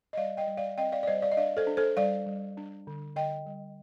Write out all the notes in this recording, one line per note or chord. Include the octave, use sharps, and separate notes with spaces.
D#5
G3 D5 F5
D#5 G5
G3
D5 F5
C4 D#5 G5
D5 F5
D5
G3 C5 D#5
D5 F5
D#5
D4 D5 F5
A4 C5
D4
A4 C5
G3 D5 F5
G3
D4
D3
D3 D#5 G5
G3